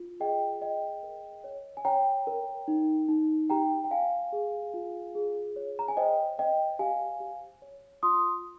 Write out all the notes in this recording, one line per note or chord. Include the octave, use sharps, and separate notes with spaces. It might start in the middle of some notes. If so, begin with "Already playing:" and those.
Already playing: F4
G#4 D#5 G5
G#4 D#5 G5
A#4
C#5
G#5
C#5 G5 A#5
A#4
D#4
D#4
G4 G5 A#5
G5
G4 F5 G#5
G#4
F4
G#4
C#5
A#5
G#5
C5 D#5 G5
C5 D#5 G5
G4 F5 G#5
G4
C#5
F4 C6 D#6